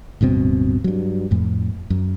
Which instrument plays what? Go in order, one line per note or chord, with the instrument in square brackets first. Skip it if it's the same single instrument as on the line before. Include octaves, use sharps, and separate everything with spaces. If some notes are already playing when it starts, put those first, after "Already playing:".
[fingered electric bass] D1 G2 B2 C4
G2 F#3
F2 A2
F#2